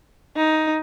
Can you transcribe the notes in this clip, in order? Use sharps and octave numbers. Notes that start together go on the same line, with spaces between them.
D#4